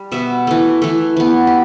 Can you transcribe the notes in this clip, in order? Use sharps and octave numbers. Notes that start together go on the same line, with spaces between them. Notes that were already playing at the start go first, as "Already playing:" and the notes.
Already playing: G3
B2 B3 E5
E3 A3
E3 A3
E3 B3
G4